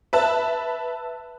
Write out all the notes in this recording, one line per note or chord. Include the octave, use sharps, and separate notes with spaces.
B4 E5 A5